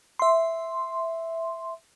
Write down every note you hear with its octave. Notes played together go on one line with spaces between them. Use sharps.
E5 C6